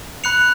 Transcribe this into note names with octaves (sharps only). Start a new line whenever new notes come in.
B5 F#6 C#7 F7